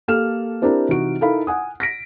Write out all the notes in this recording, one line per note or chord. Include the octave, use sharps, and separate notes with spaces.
A#3 G4 A4 F6 E7
C4 D4 E4 G4 A#4
C3 E3 D#4 F#4 D7
D#4 E4 A4 A#4 F5 B5
F#5 G#5 D#6
A#6 B6 D7